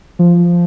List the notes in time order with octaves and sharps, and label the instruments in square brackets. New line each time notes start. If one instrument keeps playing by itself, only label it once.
[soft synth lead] F3